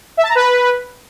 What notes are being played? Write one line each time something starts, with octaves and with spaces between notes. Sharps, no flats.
E5
A5
A#5
B4